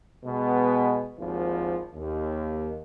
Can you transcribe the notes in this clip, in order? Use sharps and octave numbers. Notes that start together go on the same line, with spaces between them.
B2 G#3 B3
G#1 D#2 F3
D#2